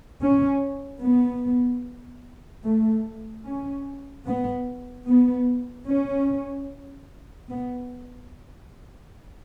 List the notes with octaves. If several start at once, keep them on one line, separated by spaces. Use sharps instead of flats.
C#4
B3
A3
C#4
B3
B3
C#4
B3